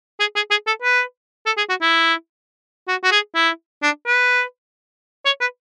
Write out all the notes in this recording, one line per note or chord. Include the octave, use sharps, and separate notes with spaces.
G#4
G#4
G#4
A4
B4
A4
G#4
F#4
E4
F#4
F#4
G#4
E4
D4
B4
C#5
B4